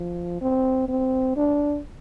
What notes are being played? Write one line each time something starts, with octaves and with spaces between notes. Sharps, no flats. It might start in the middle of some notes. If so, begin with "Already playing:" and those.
Already playing: F3
C4
C4
D4